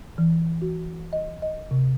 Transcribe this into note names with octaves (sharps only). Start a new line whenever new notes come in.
E3
F#4
D#5
D#5
C3